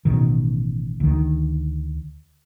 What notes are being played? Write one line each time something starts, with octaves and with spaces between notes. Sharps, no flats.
A1 B2 D#3
D2 D#3